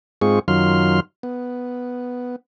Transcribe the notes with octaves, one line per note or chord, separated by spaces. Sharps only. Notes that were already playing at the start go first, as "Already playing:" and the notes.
G#2 G#3 C4 F4 G#4 C#6
F#2 D#3 F#3 F4 C6 F6
B3